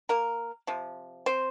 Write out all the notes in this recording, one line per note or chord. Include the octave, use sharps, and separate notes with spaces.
A#3 A#4
C3 F3
C4 C5